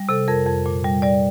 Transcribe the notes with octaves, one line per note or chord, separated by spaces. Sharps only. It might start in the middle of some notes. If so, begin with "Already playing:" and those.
Already playing: G3
C3 A4
F2 A#4
F2
A#2
G3
G3 D5